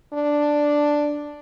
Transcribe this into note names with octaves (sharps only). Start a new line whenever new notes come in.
D4